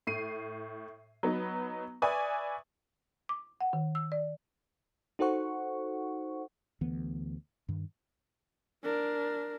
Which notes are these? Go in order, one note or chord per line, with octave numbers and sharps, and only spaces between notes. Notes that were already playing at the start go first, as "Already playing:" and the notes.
A2 C7 D#7
F#3 B3 D#4
B4 D5 E5 G#5 C#6 D#6
D6
F#5
D#3
E6
D5
D#4 F#4 A4 C5 F#5 C#6
D2 E3 B3
G2 D#3
D4 A#4